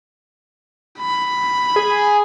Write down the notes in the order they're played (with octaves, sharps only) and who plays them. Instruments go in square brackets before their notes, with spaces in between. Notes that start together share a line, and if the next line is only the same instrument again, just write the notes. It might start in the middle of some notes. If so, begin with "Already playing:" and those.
[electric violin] B5
[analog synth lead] G#4